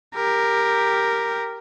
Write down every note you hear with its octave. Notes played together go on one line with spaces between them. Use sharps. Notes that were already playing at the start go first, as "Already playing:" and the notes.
G4 A#4